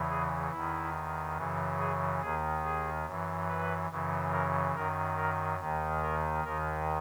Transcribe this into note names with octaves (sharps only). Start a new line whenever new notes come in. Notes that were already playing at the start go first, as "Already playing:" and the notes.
Already playing: E2 C#3 E3
G#4
E2 D#3 E4
F#2 C#3 E3
G#4
D#2 D#3 G#4
G#4
F#2 E3
B4
F#2 C#3 E3
A#4
F#2 D#3 A#4
A#4
D#2 D#3
A#4
D#2 D#3 A#4